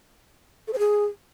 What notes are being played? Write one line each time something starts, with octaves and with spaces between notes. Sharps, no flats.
A4
C5
G#4